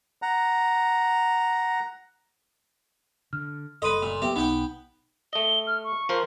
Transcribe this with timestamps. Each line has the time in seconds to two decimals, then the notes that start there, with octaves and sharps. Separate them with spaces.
0.22 F#5 A#5
3.33 D3 F6
3.82 F#1 A4 B4 D#5 C6 D#7
4.02 A#2
4.22 F#3 A#3 B3 G4 B4 E5
4.36 B1 B3 D#4 G5
5.33 A3 D#5 G7
5.67 F6
5.84 C#6
6.09 F3 A#4 C5